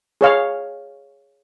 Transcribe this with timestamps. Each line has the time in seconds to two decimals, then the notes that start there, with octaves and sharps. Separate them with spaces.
0.21 G#4 C#5 F5